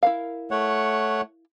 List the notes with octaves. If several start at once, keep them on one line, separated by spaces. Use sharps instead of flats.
E4 A#4 F5
A3 C#5 F#5